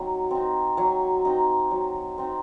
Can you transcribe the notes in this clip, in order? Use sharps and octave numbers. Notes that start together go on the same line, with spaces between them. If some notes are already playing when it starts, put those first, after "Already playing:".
Already playing: F#3 C4 D#4
C4 D#4
F#3 G#5
C4 D#4
F#3
C4 D#4